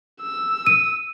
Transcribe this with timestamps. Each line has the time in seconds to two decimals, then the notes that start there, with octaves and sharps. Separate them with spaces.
0.21 E6
0.67 D#7